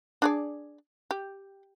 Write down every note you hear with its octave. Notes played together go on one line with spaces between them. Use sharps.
D4 G#4 D5
G4